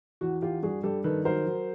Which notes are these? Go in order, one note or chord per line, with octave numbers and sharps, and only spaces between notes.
E2 F#4
E2 F4 G4
G2 F#4 G#4
G2 G4 A4
D#3 A4 B4
F#3 A#4 C5
F#3